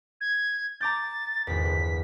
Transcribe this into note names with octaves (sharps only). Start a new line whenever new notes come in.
G#6
A#5 D6 G6 A6
G#1 E2 B6
G1 C7